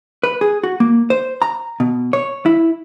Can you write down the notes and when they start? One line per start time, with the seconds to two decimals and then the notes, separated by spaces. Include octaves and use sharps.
0.23 B4
0.41 G#4
0.63 F#4
0.80 A#3
1.10 C5
1.42 A#5
1.80 B2
2.13 C#5
2.46 E4